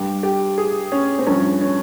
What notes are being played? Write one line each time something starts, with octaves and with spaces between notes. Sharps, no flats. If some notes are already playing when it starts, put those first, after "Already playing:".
Already playing: G2 G3 G4
G4
G#4
C#4
C4
G2 F3 C#4
C#4